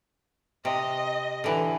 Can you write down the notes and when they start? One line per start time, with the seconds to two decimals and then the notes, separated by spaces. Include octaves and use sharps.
0.65 C3 D#5
1.44 D3 E3